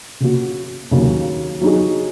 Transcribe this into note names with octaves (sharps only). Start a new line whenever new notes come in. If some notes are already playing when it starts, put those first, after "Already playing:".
C#3 A#3 F#4
D#2 C#3 F#3 A#3
F#3 D#4 G#4